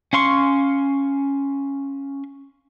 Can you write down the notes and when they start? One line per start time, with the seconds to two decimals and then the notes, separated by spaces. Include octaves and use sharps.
0.13 C#4 F5 C6 C#6